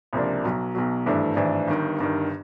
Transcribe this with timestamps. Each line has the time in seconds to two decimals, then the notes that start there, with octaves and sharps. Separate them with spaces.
0.13 C#2 C3 F3 A#3 D4
0.44 B1 B2 F#3
0.75 B1 B2 F#3
1.06 G#1 G2 E3 A3 D4
1.36 G#1 G2 E3 A3 D4
1.68 G1 G2 D#3
1.98 G1 G2 D#3